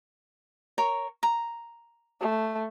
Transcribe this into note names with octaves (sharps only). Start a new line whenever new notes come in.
A#4 C#5 C#6
A#5
A3